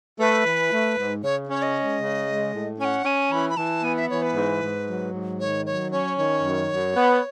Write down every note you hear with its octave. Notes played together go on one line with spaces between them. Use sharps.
A3 B4
E3
A3
G#2
C#3 C#5
C#4 C#5
D#5
G#3
C#3
G#3
A2
C#4 F#5 G#5
C#4 G#5
E3 B5
B5
E3 A5
B3 G#5
E5
E3 C#5
B4
G#2
G#2
F#3
G#2
D#3 C#5
F#3 C#5
C#4 C#5
D#3 C#5
F#2
F#2
B3